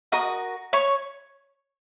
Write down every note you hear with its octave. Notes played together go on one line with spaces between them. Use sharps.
F#4 A#4 D#5 D#6
C#5 C#6